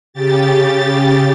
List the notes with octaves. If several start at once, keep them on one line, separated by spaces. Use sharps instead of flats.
C#3 G4 A6